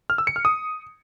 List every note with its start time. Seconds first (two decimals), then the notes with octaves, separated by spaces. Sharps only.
0.10 F6
0.18 E6
0.27 C#7
0.36 F6
0.45 D#6